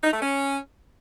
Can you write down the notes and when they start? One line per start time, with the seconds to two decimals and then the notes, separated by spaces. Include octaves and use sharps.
0.04 D#4
0.13 A3
0.22 C#4